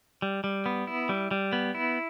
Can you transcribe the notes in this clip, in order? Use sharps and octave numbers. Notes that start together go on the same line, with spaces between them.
G3
G3
B3
E4
G3
G3
B3
E4